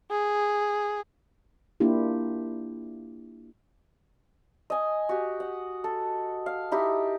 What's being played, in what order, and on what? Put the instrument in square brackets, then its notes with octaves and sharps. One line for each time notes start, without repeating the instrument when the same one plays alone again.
[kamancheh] G#4
[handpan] A#3 D4 E4 F4 G4
[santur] D#5 G#5
F#4 G4
F#5
A4
F5
D#4 E4 G4